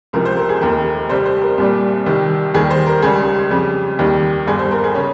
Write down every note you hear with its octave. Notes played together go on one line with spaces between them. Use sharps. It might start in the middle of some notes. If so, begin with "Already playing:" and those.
C#2 C3 F3 A#4
C5
A#4
G#4
F1 D#2 D#3 A#4
C2 C3 G3 C5
C5
A#4
C2 A#2 G3
C2 C3 D#3 G3
D#2 D#3 G3 G#4
C5
A#4
C#2 C#3 G3 G#4
F2 C#3 G3
D#2 D#3 G3
G1 G2 G3 G#4
C5
A#4
G#4
C#3 C#4